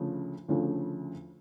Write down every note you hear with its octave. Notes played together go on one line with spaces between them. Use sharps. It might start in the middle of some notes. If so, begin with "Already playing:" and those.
Already playing: D2 C#3 F3 A3
D2 C#3 F3 A3